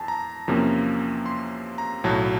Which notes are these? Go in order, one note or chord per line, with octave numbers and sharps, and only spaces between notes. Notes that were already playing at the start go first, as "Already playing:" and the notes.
Already playing: E2 G#5 A5
A#5
E2 C3 F3 A#3 C#4
C6
A#5
B1 A2 F#3 A5